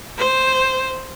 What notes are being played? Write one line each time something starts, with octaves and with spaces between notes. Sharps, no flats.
C5